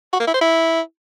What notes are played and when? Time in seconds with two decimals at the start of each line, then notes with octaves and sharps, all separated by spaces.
0.13 F#4
0.20 A#3
0.27 E4
0.34 C5
0.41 E4